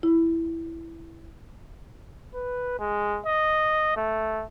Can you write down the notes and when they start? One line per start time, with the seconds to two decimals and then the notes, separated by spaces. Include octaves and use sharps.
0.03 E4
2.34 B4
2.79 G#3
3.27 D#5
3.96 A3